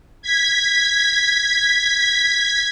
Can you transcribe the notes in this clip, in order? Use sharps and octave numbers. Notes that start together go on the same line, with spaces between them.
G#6 B6